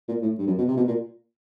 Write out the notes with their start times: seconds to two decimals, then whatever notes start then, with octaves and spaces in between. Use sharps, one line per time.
0.08 A#2
0.22 A2
0.38 G2
0.47 F#2
0.58 B2
0.68 C3
0.77 B2
0.88 A#2